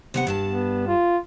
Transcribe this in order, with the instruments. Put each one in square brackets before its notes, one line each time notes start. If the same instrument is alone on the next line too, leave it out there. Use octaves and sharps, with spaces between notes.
[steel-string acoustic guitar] C3 B3 F#5
G2 D4 A5
[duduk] B3
F4